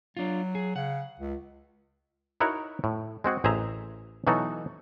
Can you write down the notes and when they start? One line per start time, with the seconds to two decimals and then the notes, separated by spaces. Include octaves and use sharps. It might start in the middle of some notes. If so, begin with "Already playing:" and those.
0.17 F#3 D4 F4
0.55 G#4
0.76 C#3 F#5
1.19 C#2
2.40 D#4 E4 F#4 A#4 C#5 F#5
2.84 A2
3.24 G#3 C4 F#4 G#4
3.44 A1 G#4 C5 E5 A#5
4.27 B2 E3 F#3 D#4 F#4 A4